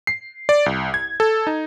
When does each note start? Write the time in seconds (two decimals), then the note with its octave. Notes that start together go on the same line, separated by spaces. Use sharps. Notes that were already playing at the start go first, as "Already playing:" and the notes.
0.07 C7
0.49 D5
0.66 C2
0.94 G#6
1.20 A4
1.47 D#4